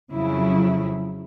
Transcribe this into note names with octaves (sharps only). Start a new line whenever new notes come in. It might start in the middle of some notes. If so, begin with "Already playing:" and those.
F2 C#3 F#3 E4